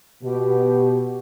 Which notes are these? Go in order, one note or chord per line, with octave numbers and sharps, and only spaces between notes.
B2 G4